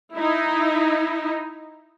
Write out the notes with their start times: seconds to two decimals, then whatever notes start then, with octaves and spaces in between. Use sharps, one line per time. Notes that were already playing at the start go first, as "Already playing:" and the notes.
0.15 D#4 E4